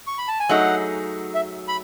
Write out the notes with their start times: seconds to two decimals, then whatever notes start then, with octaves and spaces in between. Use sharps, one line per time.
0.07 C#6
0.18 B5
0.28 A5
0.40 G#5
0.49 F#3 A3 D#4 G#4 F#5
1.35 E5
1.68 B5